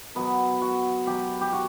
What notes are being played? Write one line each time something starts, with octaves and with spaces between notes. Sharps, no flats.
B2 F#3 B3
F#4
B2 F#3 G4
G4
F#4